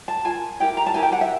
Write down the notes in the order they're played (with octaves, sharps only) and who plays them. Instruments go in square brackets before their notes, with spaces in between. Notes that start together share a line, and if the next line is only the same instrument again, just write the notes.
[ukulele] A5
F4 A#4 G#5
E4 G4 A#4 G5
A#5
A5
E4 G4 A#4 G#5
G5
F#5
E5